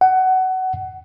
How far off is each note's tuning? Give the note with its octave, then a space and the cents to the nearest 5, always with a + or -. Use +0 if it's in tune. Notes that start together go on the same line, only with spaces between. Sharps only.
F#5 +20